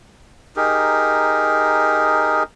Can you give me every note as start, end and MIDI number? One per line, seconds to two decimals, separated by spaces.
0.56 2.43 63
0.56 2.43 67
0.56 2.43 68
0.56 2.43 70